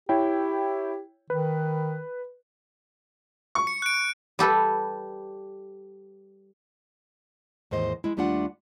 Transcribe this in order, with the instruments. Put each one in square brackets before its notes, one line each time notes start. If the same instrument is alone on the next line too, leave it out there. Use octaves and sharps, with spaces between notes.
[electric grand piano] E4 C#5 G5 [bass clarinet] G4
[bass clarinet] D#3 [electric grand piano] B4
[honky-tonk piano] C#6
[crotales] C#7
F#6 D7
[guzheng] G3 G4 A4 B4
[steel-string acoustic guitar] D#2 G#2 E3 C5 D#5
G#3 E4
D#2 G3 A3 D4 F4 F#5